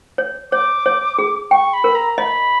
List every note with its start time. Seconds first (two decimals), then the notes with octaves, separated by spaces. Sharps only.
0.18 C#5
0.52 C#5 D6
0.86 C#5
1.18 G#4
1.51 G5 C#6
1.73 B5
1.84 A#4
1.95 A#5
2.18 D#5 B5